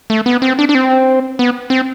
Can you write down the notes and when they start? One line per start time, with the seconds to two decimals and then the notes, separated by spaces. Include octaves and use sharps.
0.10 A3
0.26 B3
0.42 C4
0.59 D4
0.69 D4
0.75 C4
1.39 B3
1.70 C4